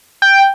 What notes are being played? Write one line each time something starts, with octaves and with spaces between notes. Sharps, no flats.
G5